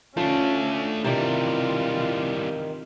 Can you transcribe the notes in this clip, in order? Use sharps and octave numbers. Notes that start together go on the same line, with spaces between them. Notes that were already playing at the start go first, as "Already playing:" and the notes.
F3 A3 C#4 D4
C3 D#3 E3 G3 F4 D5